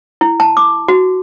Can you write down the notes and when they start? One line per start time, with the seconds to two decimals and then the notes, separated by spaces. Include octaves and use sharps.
0.21 E4
0.40 A5
0.57 D6
0.88 F#4